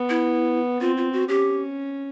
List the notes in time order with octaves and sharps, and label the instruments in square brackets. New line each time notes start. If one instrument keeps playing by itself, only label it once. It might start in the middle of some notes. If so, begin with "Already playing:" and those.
Already playing: [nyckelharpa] B3
[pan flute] E4
[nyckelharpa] C4 [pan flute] F4
[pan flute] F4
F#4
[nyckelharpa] C#4 [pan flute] G4